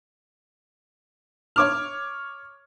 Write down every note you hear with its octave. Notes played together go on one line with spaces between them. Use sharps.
C#5 D6 F6